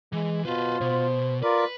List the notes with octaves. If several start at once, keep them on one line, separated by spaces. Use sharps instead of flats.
E3 G#3
B2 F4 B4 C5
B2 C5
F4 A#4 B4 D5